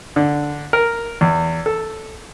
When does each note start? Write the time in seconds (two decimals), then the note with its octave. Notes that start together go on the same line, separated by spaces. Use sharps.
0.16 D3
0.73 A#4
1.21 E2
1.66 A4